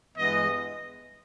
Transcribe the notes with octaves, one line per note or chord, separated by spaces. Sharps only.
G2 E3 G#3 B3 D#5